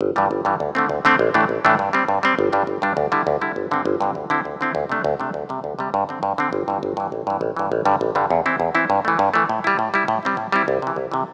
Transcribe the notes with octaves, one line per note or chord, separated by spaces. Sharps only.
G1
G2 E3 G3
G1
G2 E3 G3
D2
D3 A3 C4
D2
D3 A3 C4
A1
A2 E3 A3 D4
A1
A2 E3 A3 D4
G2
G3 C4
G2
G3 C4
G1
G2 G3 D4
G1
G2 G3 D4
D2
D3 G3 E4
D2
D3 G3 E4
G1
G2 D3 C4
G1
G2 D3 C4
D2
D3 C4 E4
D2
D3 C4 E4
D2
C3 A3 D4
D2
C3 A3 D4
D2
C3 G3
D2
C3 G3
G2
D3 C4
G2
D3 C4
G1
G2 E3
G1
G2 E3
A1
G2 E3
A1
G2 E3
A1
G2 D3 G3
A1
G2 D3 G3
E2
E3 C4 E4
E2
E3 C4 E4
G2
E3 A3
G2
E3 A3
A2
G3 E4
A2
G3 E4
A2
G3 C4 E4
A2
G3 C4 E4
C2
C3 E3
C2
C3 E3